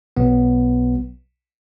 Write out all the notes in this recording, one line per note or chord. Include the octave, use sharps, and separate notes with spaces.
B1 B2 F#3 B3